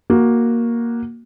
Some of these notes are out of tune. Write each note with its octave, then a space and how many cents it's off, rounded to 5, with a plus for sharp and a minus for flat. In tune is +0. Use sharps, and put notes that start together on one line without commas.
A#3 +5 F#4 +0